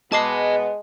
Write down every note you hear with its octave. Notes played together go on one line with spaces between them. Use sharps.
B2 G#3 B3 G#4 D#5 A5 D6 C7